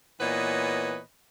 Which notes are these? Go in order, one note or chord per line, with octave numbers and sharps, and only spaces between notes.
A#2 E3 B3 B4 C#5 D#5